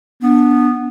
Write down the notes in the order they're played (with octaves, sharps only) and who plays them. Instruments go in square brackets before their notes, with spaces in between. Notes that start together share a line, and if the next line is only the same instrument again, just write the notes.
[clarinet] B3 [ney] D4